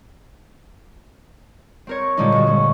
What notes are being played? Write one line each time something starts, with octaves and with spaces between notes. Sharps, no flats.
C4 A#4 C#5
A#2 D3 G3 G#3 C#4 D#4
G1 F#4
C#4